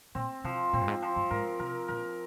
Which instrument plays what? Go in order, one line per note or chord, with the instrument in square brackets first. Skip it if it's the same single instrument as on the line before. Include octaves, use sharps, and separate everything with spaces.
[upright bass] A#2 [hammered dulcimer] C4
[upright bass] C3 [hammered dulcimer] F3
[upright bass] A#2 [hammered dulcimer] C4
[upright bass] G2
G#2
[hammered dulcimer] F3
[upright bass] G2
[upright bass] G#2 [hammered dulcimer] A#4
[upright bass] C3 [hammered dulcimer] A#4
[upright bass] A#2 [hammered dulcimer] A#4